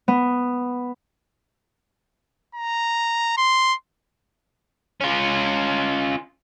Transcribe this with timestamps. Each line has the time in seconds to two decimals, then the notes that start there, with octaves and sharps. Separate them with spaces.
0.08 B3
2.55 A#5
3.37 C6
5.01 C#4 F4